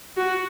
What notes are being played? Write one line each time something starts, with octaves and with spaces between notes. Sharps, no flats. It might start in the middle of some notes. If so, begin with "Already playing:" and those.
F#4